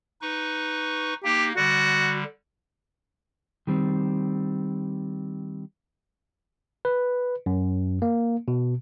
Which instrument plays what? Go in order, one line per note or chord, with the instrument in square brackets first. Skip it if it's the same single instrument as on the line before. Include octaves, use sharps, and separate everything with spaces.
[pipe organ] D#4 B4 C#6
[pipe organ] A#3 D#4 [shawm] G4
[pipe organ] D3 G3 [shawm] F#4
[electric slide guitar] D#3 G3 C4
[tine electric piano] B4
F#2
A#3
B2